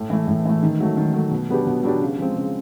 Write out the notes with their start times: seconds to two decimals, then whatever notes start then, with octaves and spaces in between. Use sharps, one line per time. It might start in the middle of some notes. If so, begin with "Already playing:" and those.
Already playing: A2
0.10 E3 A3
0.28 A2
0.45 E3 A3
0.63 D#3
0.80 F#3 A3
0.97 D#3
1.14 F#3 A3
1.31 B2
1.49 F#3 B3 D4 G4
1.67 B2
1.83 F#3 B3 D4 G4
2.01 C#3
2.18 F3 G#3 C4
2.36 C#3